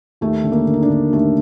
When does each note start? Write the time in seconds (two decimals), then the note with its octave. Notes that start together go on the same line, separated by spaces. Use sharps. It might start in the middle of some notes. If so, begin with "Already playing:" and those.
0.21 D#2 A3
0.44 D3
0.52 A#3
0.67 D3
0.74 D#4
0.82 D4
0.90 D3
1.13 D#2 A3